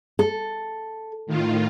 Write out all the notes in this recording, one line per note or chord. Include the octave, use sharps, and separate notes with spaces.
A4
A2 D#3 F4